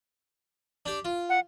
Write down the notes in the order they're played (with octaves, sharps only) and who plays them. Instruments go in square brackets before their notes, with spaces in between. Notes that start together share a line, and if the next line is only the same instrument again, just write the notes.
[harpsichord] D4 G4
F4
[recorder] F#5